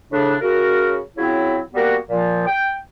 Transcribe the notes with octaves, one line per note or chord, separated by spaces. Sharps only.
A2 C#3 D4
C#3 F#4 A#4
C#3 F#3 C4 E4
G3 A#3 B3 F#4
A#2 F3
G5